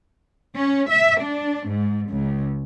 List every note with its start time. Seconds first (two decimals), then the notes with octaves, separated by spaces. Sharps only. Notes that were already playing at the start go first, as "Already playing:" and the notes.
0.55 C#4
0.90 E5
1.21 D4
1.68 G#2
2.11 C#2